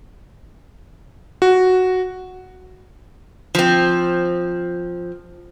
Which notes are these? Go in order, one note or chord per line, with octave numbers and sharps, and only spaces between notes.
F#4
F3 C4